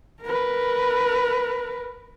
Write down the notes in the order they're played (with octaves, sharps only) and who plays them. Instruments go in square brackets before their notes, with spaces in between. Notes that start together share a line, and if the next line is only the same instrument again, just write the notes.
[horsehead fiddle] A#4 B4